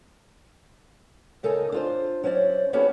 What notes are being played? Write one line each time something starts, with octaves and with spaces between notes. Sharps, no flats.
C#3 D#4 A4 A#4 D#5 G#5
D4 F4 C5
F#3 C#4 C5 D5
A#3 B3 C#4 F#4 G4 A4